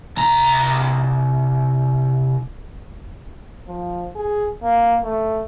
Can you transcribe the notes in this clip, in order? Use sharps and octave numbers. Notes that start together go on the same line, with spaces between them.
C2 A#5
F3
G#4
A#3
A3